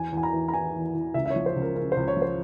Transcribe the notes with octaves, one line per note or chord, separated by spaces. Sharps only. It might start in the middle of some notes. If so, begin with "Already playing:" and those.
Already playing: E2 G#5
E2 G#5
A#5
E3
A#5
E3 G#5
E2
E2
C#2 E5
E5
C#5
F3
C5
C#2
A#4
C#3 A#4
C#2 C5
C#5
F3
C5